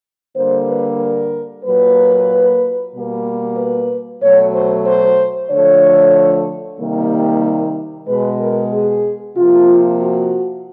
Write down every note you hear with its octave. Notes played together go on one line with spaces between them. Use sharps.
D3 G3 A#3 C5
B4
A#4
A#2 F#3 A#3 B4
B2 G3 A#3
B4
B2 F#3 A3 C#5
C5
C5
D3 F3 A3 C#5
C3 D#3 G3 A#3
B2 G#3 B4
A#4
G#4
C3 F3 A#3 F4
F#4